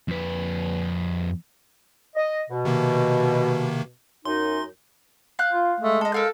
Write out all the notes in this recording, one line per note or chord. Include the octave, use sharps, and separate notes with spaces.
F2 B4
D#5
B2
C3 D#3 A#3
F#2 D#4 C6
F5 F#6 G6
F4
G#3 A3
A4 D#5
A4 A#4 F5 G6